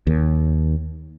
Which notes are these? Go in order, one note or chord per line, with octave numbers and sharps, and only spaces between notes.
D#2